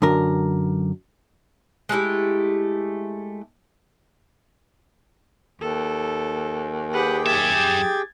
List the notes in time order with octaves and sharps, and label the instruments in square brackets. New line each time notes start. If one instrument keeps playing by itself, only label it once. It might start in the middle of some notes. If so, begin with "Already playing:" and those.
[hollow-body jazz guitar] F#2 D3 A#4
[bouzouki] G#3 A3 E4 G4
[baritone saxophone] D#2 [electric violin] A4
[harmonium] G4 G#4 G5 [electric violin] B4 F#5
[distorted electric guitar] F#2 E5 [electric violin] G#6 A6